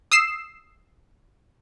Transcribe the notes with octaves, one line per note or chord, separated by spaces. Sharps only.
D#6 E6 C7 E7